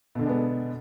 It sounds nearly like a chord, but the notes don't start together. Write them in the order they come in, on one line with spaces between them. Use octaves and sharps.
B2 D3 D4 G#3 B3